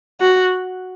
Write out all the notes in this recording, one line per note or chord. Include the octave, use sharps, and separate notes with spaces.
F#4